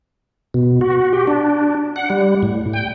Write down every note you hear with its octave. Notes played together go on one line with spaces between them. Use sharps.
B2
F#4
G4
D4
F#5
G3
A2
G5